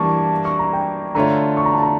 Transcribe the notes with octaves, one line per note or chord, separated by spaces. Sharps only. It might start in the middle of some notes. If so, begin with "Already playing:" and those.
Already playing: E3 G3 A#3 D4 A5 C#6
C#6
A#5
G5
D3 A3 D4 F4 C#5 A#5
C#6
A#5
A5
A#5